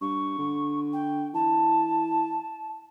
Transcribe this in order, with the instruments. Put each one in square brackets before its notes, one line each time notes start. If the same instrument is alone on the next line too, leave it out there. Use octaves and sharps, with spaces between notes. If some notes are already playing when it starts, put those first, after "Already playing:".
[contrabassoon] G2 [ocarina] C#6
[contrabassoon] D3
[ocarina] G5
[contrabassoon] E3 [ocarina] A5